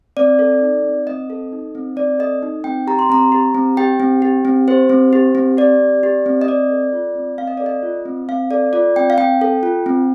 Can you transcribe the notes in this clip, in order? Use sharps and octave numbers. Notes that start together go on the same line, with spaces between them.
C4 D5
A4
D#4
C4
C4 D#5
A4
D#4
C4
C4 D5
A4 D#5
D#4
C4 G5
G4 A#5
C6
C4 A#5
G4
C4
G4 G5
C4
G4
C4
G4 C5
C4
G4
C4
G4 D5
C4
G4
C4
D#5
C4 D5
A4
F4
C4
C4 F5
D#5
A4 D5
D#5
F4
C4
C4 F5
A4 D5
F4 D5
C4 G5
F5
C4 G5
A4
F4
C4